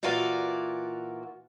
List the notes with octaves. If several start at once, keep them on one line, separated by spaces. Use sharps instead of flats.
A#2 E3 F4 F#4 A#4 D5